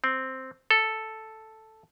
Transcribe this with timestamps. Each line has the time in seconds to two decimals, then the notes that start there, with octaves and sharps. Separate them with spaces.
0.04 C4
0.71 A4